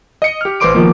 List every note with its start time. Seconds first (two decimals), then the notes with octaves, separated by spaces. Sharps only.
0.22 D#5 C#7
0.41 G4 F6
0.60 A1 B4 C5 C6 D6 D7
0.75 B2 D#3 F3 A#3